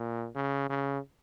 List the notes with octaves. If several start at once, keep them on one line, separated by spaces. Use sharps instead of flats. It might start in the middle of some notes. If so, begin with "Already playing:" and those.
Already playing: A#2
C#3
C#3